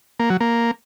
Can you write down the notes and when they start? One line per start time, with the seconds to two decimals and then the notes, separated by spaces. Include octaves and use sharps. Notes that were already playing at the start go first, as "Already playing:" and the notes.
0.20 A#3
0.30 F#3
0.41 A#3